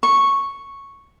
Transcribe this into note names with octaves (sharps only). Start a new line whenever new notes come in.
C#6